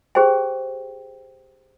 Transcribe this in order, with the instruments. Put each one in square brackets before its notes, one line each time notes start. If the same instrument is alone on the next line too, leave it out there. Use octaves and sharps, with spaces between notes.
[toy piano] G4 G#4 C5 G5 G#5